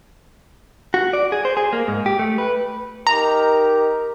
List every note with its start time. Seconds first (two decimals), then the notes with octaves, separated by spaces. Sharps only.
0.94 F#4
1.13 D5
1.32 G#4
1.45 C5
1.57 G#4
1.73 A#3
1.88 G#2
2.06 G4
2.19 A3
2.38 B4
3.07 D#4 G4 A#4 A#5